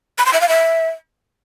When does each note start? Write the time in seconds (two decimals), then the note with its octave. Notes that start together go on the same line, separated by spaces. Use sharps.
0.18 B5
0.26 C6
0.33 E5
0.41 F5
0.49 E5